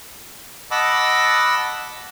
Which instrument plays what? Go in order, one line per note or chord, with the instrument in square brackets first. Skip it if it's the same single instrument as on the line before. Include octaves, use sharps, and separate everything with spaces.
[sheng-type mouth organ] D#5 F#5 A5 B5 D6 E6